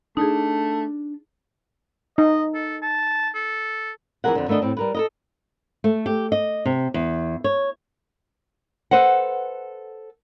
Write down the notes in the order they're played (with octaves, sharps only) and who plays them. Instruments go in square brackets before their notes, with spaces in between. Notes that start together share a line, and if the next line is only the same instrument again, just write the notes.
[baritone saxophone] A3 [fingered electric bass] D4 [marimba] D#4 G#4
[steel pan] D#4 [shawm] D#5
[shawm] A4
A5
A4
[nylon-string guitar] F2 E3 C#4 G#4 A#4 F#5
F2 D3
D#3 A3 B3 D4 D#5
A2 C4
G3 A#4 B4
A4 A#4 D#5
A3
G4
D#5
C3
E2
C#5
A4 B4 C5 D#5 F#5